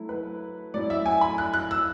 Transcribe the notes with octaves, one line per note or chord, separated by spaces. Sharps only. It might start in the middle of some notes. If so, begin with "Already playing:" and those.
Already playing: F#3 A3 E4
B4
A2 F#3 C#4 E4 D5
E5
G#5
B5
F#6
F#6
E6